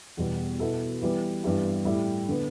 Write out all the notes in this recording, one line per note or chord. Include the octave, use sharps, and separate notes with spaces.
E2 B2 G3
B2 B3 E4 A4
E3 G3 B3
G2 E3 B3 E4 G4
A2 G3 E4 G4
D3 B3